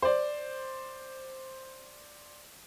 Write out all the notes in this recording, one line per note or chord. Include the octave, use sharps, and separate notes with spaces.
C5 D5